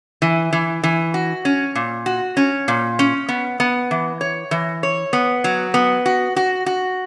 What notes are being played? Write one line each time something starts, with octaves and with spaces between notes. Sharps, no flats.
E3
E3
E3
F#4
C#4
A#2
F#4
C#4
A#2
C#4
B3
B3
E3
C#5
E3
C#5
B3
F#3
B3
F#4
F#4
F#4